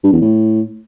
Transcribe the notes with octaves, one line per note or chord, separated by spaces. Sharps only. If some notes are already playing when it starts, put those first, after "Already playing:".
G2
E2
A2